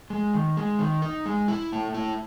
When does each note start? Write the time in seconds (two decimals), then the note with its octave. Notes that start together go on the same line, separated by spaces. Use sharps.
0.10 G#3
0.34 D#3
0.57 G#3
0.79 D#3
1.02 D#4
1.26 G#3
1.48 E4
1.72 A3
1.94 E4